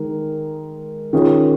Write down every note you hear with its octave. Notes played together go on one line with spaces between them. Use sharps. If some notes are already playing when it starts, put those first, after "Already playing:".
Already playing: D#3 G#3 A#4
D#3 C#4 F4 G#4